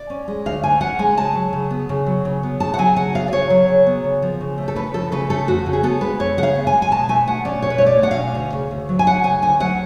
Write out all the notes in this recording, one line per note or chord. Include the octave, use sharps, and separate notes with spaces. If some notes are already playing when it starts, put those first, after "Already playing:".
Already playing: D5
C#4
G#3
D2 F5
D3 G#5
C#4 F#5
G#3 G#5
C#3 A5
F#3
C#3
B3
C#3
F#3
C#3
B3
C#3 A5
F#5
F#3 G#5
C#3 F#5
B3 F5
D5
C#3 C#5
F#3
C#3
B3
C#3
F3
C#3
A3
A4
C#3 B4
F3 A4
C#3 B4
A3 A4
F2 F#4
C#3
G#4
B3 A4
G#3 B4
F2 C#5
C#3 F#5
F5
B3
G#5
G#3
G#5
B2 A5
A3 G#5
B2 F#5
C#4 D5
B2 C#5
B4
C#5
A3
D5
B2 F#5
F5
C#4
D2
C#3
D2
F#3
G#5
D2 F#5
C#3 G#5
D2 G#5
F#3 F#5